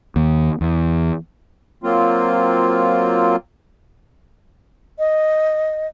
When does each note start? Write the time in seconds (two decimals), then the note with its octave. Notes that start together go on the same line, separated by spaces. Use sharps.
0.16 D#2
0.61 E2
1.84 F#3 A#3 C4 F4
4.99 D#5